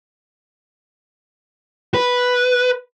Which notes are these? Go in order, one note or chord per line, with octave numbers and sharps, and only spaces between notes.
B4